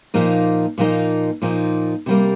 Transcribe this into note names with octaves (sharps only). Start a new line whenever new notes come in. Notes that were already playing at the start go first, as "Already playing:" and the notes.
A#2 F3 A#3 D#4
A#2 F3 A#3 D#4
A#2 F3 A#3 D#4
C3 G3 A#3